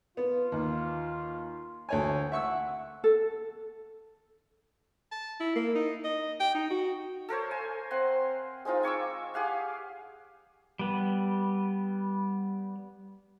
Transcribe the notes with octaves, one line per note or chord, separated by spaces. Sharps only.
B3 F4
D#2
D2 C#5 G#5
E5 F#5 C#6 E6
A4
A5
E4
A#3
D#4
D#5
G5
D#4
F#4
A4 A#4 C5 C#5
G#5
C4 F#5 C6
G#3 C4 D#4 F4
G#5 C#6 D6 E6
G4 G#4 F5 F#5
G3 B3